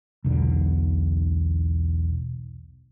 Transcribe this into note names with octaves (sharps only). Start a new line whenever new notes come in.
E1 B1 D3